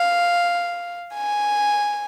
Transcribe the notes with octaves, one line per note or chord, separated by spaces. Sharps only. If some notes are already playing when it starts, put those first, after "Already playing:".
Already playing: F5
G#5